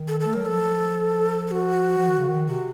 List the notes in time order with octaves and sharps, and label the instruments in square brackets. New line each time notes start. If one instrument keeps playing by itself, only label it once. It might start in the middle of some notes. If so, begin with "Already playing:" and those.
Already playing: [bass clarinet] D#3
[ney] A4
A4
[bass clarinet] A3
[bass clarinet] F#3 [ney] A#4
[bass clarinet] F3 [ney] A4
[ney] A4
F#4
[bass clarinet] F3
D#3
C#3
D#3
[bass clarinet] C3 [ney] F#4